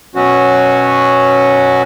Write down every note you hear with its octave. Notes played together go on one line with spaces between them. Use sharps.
B2 F#3 C#4 F#4